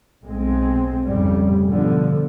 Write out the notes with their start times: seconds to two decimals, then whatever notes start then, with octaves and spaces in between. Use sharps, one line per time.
0.23 B1 G#3 C4
1.04 F1 F2 G#2 C#3 G3
1.65 B2 D3 F3